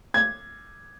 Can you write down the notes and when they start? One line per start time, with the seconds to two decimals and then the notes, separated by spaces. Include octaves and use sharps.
0.14 G#6